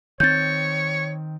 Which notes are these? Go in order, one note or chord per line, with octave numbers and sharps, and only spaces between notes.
D#3 C4 C#5 G6 A6